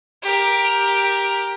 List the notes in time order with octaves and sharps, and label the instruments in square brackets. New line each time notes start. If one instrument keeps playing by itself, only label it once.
[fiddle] G4 A#4